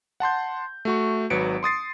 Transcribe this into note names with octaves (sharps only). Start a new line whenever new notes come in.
F#5 A5 C6 G6
A3 F#4 C#6
G#1 F#3 B4 C#7 D7
C6 D#6 A6 C7